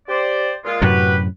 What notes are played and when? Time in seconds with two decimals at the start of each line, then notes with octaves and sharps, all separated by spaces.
0.08 G4 C5 D5
0.64 A#2 G#3 F4
0.82 F#2 A2 C3 F#4 G4 B4